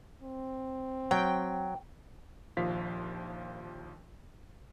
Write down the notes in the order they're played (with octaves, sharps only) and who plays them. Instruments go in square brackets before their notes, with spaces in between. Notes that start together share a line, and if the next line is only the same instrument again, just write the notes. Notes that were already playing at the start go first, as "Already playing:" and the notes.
[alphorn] C4
[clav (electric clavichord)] F#3 [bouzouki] G5
[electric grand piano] A#1 D#2 F3 F5 B6